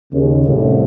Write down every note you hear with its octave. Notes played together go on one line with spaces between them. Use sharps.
D#2 C#3
C2 A2